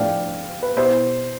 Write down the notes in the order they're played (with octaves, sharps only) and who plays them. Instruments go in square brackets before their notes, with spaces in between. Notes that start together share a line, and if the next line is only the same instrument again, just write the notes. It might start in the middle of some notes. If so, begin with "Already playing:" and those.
Already playing: [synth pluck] A2 F3 A3 D4 [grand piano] D5 F5 G5
[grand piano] B4
[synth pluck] B2 B3 E4 G4 [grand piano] C5